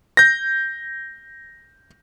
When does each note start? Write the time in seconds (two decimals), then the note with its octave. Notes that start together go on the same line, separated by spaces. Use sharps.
0.17 G6 A#6